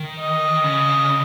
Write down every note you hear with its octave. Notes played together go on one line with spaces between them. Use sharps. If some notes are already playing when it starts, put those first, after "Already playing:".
Already playing: D#3
D#5
C#3